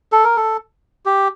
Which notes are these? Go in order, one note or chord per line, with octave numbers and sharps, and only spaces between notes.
A4
A#4
A4
G4